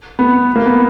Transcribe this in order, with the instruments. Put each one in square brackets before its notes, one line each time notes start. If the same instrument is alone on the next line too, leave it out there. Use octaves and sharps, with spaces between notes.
[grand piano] B3
A#3
B3